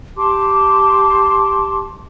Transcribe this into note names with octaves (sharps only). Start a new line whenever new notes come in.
G4 A5 C6 D6